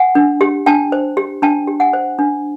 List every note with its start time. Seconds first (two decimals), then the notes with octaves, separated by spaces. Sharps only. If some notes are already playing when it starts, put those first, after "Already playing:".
Already playing: F#5 G#5
0.15 D4
0.41 G4
0.66 D4 G5 A5
0.92 C5
1.17 G4
1.42 D4 G5 A5
1.68 G4
1.80 F#5 G#5
1.93 C5
2.19 D4